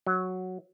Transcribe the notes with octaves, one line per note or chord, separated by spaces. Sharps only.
F#3